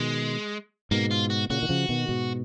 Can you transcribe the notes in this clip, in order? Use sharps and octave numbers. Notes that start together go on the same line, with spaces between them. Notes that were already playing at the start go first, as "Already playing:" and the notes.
Already playing: B2 D#3 G#3
G#2 B2 A#3
F4
F#4
A#2 C#3 F#4
D#3
C#3 F3
B2 D#3
G#2 B2